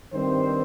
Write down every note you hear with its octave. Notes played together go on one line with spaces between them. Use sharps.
G2 D#3 G3 C4 C5